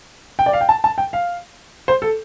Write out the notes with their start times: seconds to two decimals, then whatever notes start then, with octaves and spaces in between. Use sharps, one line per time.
0.39 G5
0.46 D5
0.53 F5
0.61 G5
0.69 A5
0.84 A5
0.98 G5
1.13 F5
1.88 C5
2.02 A4